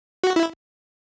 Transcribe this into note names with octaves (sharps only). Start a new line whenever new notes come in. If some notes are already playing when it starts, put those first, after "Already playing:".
F#4
E4